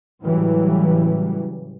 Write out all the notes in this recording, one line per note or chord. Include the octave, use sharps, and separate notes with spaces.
A2 C#3 E3 F#3 G3